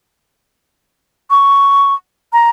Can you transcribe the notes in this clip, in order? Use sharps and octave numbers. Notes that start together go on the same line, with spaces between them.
C#6
A#5